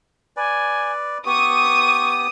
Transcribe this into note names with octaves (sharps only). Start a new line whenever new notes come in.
B4 D5 G#5
B3 G4 C#6 D#6